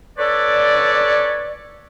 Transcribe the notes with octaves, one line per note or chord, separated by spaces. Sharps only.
C#4 A4 B4 C#5 D5